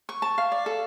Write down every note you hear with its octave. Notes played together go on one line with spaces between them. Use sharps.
C#6
A5
F5
D5
A4